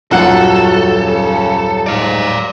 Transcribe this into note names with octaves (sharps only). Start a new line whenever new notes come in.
D#1 F#2 F4 F#4 A4 F#5 F#6
C#3
G#2 D5 F5